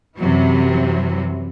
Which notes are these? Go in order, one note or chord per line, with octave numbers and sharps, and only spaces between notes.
F#2 C3 E3 F#3